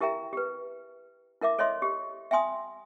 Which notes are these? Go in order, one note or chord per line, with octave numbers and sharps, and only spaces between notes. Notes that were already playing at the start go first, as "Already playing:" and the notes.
E4 G4 A#4 E5 G5 A#5
G4 B4
E4 A#4 E5 D6
A4 C#5 D#5 E5 C6
G4
E5 G5 G#5 C6 D#6